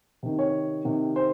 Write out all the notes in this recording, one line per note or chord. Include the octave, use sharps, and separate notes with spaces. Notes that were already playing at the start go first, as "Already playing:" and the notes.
C3 D#3
C#5
C3 D#3
C5